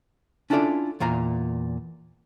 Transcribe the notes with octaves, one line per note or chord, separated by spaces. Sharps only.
C#4 D4 E4 F4 A4 D5
E2 A#2 F5 A#5